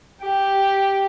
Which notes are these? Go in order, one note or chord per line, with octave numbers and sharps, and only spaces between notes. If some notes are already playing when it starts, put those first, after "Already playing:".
G4